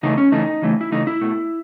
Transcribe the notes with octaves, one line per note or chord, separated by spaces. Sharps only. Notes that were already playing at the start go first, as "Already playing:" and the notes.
C#3 E3 A3 D#4
C#4
C#3 E3 A3 D#4
C#3 E3 A3
E4
C#3 E3 A3 D#4
E4
B2 A3